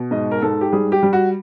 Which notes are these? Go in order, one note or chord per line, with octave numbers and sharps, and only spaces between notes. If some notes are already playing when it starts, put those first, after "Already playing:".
Already playing: B2
G#2 D#5
A#4
G#2 A4
G4
G3 G#4
G4
G3
F#4